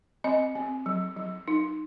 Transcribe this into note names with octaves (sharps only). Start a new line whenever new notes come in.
C4 D#5
C4
F#3
F#3
D#4